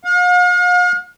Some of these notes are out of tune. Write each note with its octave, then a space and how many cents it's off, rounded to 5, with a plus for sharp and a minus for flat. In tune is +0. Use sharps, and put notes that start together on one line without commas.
F5 +45